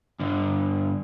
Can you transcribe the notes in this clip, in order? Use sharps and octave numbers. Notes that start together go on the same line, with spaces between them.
G2 D3